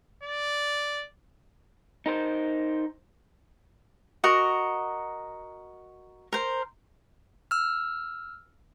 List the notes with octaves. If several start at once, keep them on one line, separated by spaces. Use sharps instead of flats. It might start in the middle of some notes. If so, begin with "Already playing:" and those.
D5
D#4 A#4 C5
F#4 A#4 D#5
A#4 C5
E6 F6